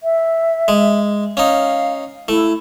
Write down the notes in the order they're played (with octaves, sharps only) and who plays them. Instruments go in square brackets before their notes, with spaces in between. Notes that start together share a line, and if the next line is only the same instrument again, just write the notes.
[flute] E5
[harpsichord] G#3
[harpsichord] C#4 D#4 [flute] F5
[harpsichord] A3 [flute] E4